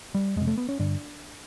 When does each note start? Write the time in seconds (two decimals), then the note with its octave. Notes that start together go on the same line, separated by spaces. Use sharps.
0.14 G3
0.36 F2 C3 G#3
0.47 A3
0.58 B3
0.69 C#4
0.79 G2 D3 D4